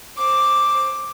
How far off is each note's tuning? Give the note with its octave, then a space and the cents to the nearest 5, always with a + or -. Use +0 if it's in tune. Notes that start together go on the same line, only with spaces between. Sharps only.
C5 +15 D6 +0